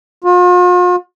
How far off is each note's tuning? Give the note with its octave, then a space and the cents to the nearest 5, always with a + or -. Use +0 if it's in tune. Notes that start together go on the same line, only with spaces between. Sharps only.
F4 +45